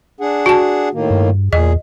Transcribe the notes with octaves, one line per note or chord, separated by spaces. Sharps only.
D4 G#4 F#5
F#4 A5
A2 D#3 A#3
G2
E2 A#2 G#4 D#5